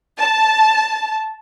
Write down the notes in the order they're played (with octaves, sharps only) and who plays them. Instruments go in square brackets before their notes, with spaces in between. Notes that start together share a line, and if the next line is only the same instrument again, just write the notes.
[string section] A5